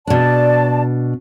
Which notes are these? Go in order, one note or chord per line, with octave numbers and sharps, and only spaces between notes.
B2 D4 D5 A5